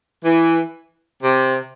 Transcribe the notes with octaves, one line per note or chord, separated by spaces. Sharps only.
E3
C3